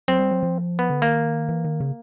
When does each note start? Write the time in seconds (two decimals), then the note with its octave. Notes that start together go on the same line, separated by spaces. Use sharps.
0.08 F#3 C4
0.19 G3
0.31 F#3
0.43 F3
0.79 B3
0.90 D3
1.02 D#3 A#3
1.49 E3
1.64 D#3
1.80 C#3